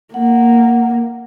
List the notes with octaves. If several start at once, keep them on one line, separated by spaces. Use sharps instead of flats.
A#3 F#5